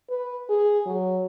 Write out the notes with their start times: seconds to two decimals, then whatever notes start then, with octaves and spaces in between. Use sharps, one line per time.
0.10 B4
0.49 G#4
0.86 F#3